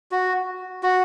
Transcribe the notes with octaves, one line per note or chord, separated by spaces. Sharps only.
F#4
F#4